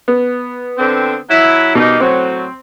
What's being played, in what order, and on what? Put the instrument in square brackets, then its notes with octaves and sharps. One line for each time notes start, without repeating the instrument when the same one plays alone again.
[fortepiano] B3
[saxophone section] D3 C4
F#3 E4
[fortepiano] B2 [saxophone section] G3 A#3 D#4
[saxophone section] A2 F#3 [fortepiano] C4